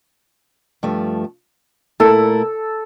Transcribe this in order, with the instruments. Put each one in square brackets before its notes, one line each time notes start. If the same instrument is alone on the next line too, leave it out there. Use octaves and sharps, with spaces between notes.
[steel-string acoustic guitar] G2 F3 A3
[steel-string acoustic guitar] A#2 A3 E4 A#4 [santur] A4